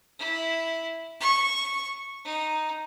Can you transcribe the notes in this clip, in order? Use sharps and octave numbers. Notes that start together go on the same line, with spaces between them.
E4
C#6
D#4